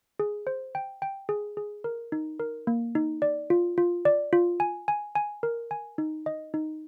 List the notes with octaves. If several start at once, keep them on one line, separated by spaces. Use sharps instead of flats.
G#4
C5
G5
G5
G#4
G#4
A#4
D#4
A#4
A#3
D#4
D5
F4
F4
D5
F4
G#5
G#5
G#5
A#4
G#5
D#4
D#5
D#4